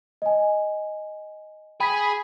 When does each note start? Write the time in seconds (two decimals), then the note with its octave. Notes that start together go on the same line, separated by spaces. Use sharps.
0.22 D#5 G#5
1.80 G#4 G5 B5 G#6 B6